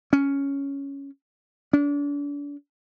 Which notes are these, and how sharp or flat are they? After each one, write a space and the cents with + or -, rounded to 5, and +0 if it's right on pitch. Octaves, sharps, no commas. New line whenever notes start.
C#4 +5
D4 -35